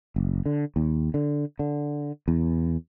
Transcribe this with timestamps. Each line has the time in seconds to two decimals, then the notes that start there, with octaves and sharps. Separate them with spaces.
0.16 F#1
0.46 D3
0.76 D#2
1.14 D3
1.59 D3
2.28 E2